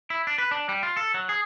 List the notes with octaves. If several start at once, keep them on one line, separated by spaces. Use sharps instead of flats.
E4
D4
B4
D4
G3
F4
A4
F#3
G#4